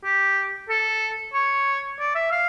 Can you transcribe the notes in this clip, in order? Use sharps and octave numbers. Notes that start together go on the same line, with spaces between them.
G4
A4
C#5
D5
E5
F5